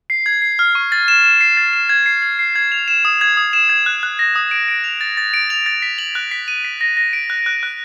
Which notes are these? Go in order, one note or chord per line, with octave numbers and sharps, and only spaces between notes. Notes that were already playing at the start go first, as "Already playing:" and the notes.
C7
G#6
C7
F6
C#6
A6
E7
E7
C7
A6
E7
G#6
C7
G#6
C7
G#6
F7
E7
D#6
G#6
D#6
E7
G#6
F#6
F#6
A#6
D#6
D7
D7
F7
A6
A6
D7
F7
A6
B6
F#7
F#6
B6
D#7
B6
A#6
A#6
D7
F#6
F#6
F#6